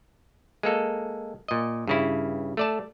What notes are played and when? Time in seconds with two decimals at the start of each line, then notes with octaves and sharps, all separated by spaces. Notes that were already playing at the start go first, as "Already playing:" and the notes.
0.63 G#3 A#3 A4
1.48 A#2 D#5
1.87 G2 C#3 E4
2.57 A3 D5 A5